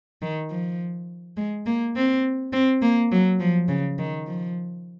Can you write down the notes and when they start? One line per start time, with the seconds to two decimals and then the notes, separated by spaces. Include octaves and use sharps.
0.22 D#3
0.51 F3
1.37 G#3
1.66 A#3
1.96 C4
2.53 C4
2.82 A#3
3.12 F#3
3.40 F3
3.69 C#3
3.98 D#3
4.27 F3